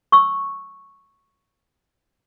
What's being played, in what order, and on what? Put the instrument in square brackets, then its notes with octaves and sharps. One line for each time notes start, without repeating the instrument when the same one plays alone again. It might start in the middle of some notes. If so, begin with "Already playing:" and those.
[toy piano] C#6 E6